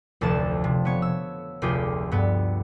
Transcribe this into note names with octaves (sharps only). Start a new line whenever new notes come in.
F1 D2 F3 A5 E7
C3
B3 C#5
E6
F1 D2 F4 G4 G#4
G2 B3